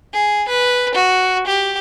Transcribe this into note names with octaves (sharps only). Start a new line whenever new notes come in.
G#4
B4
F#4
G4